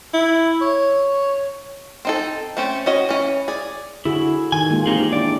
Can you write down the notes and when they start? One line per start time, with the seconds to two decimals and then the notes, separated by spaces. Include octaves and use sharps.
0.14 E4
0.61 C#5
2.05 C4 D#4 A4
2.57 A3 C4 C#4
2.86 C#4 F#4 D#5
3.09 E3 C#4
3.48 G#4 D5
4.05 D3 E4 F#4 G#4
4.52 D#3 G#5
4.70 G#3 A#3 F4
4.86 E3 C4 D#4 G4 G#4
5.13 D4 E4 D5